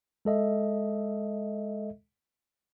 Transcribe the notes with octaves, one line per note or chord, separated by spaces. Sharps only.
G#3 A4 D#5 E5